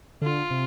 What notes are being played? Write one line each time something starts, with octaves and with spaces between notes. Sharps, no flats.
D3 F4
C3